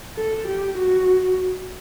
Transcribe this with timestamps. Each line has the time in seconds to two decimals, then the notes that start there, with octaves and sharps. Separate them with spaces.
0.16 A4
0.48 G4
0.78 F#4